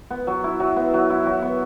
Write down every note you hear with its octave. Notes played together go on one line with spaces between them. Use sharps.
B3
F#3
E4
F#3
B3
F#3
E4
F#3
B3